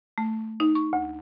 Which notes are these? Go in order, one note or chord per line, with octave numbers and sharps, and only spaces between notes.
A3
D#4
C#6
D2